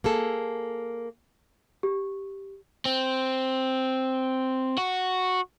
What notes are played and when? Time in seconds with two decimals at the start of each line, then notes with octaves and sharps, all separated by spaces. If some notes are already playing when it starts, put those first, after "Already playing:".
0.04 A#3 G#4 A4
1.83 G4
2.86 C4
4.78 F#4